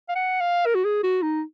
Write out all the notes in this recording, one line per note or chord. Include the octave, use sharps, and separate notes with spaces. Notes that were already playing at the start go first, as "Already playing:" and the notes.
F5
F#5
F5
A#4
F#4
G#4
F#4
D#4